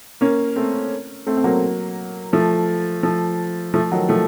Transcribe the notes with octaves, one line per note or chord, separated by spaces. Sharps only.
A#3 C#4
A3 C4
A3 C4
C4
F#3 A#3
F3 A3
F3 A3
F3 A3
D#3 F#3
F3 A3